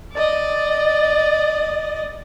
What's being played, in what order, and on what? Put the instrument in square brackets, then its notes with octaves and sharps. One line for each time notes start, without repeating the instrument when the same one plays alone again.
[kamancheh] D5 D#5